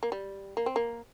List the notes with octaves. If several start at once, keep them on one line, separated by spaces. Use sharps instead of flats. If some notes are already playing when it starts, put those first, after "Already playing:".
A#3
G3
A#3
C4
A#3